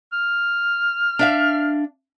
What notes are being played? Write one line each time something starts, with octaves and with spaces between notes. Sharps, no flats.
F6
D4 E5 F5